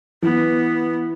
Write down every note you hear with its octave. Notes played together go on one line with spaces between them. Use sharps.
E3 B3